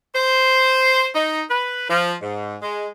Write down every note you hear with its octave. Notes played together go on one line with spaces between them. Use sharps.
C5
D#4
B4
F3
G#2
G#3